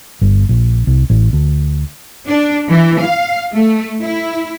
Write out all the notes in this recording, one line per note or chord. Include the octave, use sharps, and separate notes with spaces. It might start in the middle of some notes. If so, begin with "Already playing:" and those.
G1
A#1
C2
A1
D2
D4
E3
F5
A3
E4